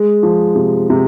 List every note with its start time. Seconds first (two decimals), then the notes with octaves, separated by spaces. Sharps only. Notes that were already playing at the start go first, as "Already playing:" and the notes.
Already playing: G#3
0.23 F3
0.55 C3
0.90 C3